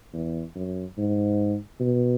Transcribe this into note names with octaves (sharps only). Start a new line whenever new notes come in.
E2
F#2
G#2
B2